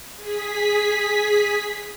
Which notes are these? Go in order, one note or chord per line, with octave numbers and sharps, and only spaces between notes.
G#4 B6